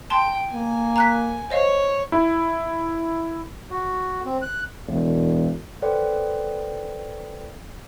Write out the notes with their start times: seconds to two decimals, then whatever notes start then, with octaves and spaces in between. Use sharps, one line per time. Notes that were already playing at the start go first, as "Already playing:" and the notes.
0.10 G5 A5 C6
0.53 A#3 G#5
0.96 A#5 F#6 B6
1.50 C5 C#5 D#5 F5
2.12 E4
3.70 F#4
4.25 C4
4.42 F#6
4.87 E1
5.82 A4 B4 C5 D5 F#5 G5